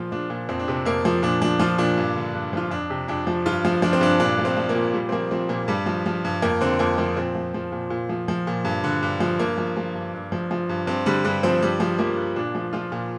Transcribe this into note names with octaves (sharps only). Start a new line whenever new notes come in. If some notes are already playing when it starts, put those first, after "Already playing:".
Already playing: A#2 F3 F4
F3 D4
A#2
F2 C4
D4
C3 C4
F2 A#3
F3
A#2 D4
F3 D4
F3 F4
A#2 D4
G2
D3
G2
F3 F4
F2 D4
C3
F2 D4
F3
G2 F4
F3
F3 D4
C4
G2 D4
A#2 D4
F3
C4
F3
A#3
A#2
A#2 G3
C4
F3 A#3
F3 C4
A#2 A#3
G2 G3
F3
F3
G2
F2 A#3
D3 C4
F2 A#3
F3 A#3
A#2 C4
F3
F3
A#2
A#2
F3
F3
A#2
G2
D3
G2
F3
G2 A#3
F3
F3
G2
G2
F3
F3
G2
G2 C4
D3 G3
G2 G3
F3 C4
G2 G3
F3
F3 A#3
G2
A#2 D4
F3
F3 F4
A#2